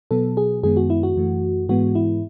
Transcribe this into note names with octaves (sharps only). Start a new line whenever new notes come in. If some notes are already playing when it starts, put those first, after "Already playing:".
B2 F#3 B3 A4
G#4
F#2 D#3 G#3 B3 G#4
F#4
E4
F#4
F#2 E3 A3
G#2 E3 G#3 B3 F#4
E4